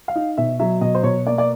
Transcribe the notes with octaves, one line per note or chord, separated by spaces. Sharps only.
F5
D#4
B2 E5
F#3 E5
B2 D#5
C5
B2 C#5
A#3 D5
D5